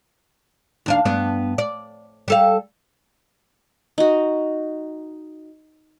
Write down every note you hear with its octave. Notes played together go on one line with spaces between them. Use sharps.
D#2 D4 F5
G2 B3 D4
D5
G3 A4 F5
D#4 F#4